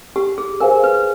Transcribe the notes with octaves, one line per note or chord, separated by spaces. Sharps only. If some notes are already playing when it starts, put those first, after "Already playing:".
G4
G#4
G#4 A#4 C5 F5 G#5
B4